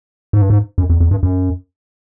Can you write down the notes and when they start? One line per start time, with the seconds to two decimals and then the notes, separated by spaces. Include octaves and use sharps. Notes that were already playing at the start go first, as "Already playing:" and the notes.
0.33 G#2
0.42 G2
0.50 G#2
0.78 F#2
0.90 F2
1.00 F2
1.11 G2
1.23 F#2